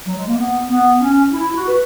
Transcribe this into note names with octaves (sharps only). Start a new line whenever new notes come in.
F#3
G#3
A#3
B3
B3
C#4
E4
F#4
B4